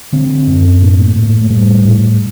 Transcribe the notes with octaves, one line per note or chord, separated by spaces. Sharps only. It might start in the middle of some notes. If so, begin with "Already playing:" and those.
D3 C4
F#2
A2 A#3
A2
A3
A2 G3
A2